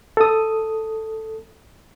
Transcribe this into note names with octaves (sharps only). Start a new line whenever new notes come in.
A4 D#6